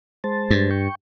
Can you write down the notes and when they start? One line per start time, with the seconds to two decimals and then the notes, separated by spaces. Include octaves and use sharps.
0.24 G#3 C5 A5
0.50 G2
0.71 G5 C#6